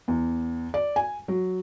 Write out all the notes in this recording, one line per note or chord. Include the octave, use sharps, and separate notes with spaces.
E2
D5
G#5
F#3